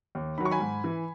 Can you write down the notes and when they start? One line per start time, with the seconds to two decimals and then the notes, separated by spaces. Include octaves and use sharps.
0.15 D#2
0.38 D#3 F#3 B5
0.45 C#6
0.51 G#5 B5
0.60 G#2
0.84 E3